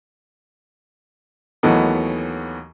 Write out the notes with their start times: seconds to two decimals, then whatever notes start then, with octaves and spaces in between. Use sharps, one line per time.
1.63 D#2 E3 F#3 A3 B3 D#4